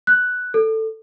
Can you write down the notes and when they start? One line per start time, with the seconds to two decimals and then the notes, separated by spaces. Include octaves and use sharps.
0.07 F#6
0.54 A4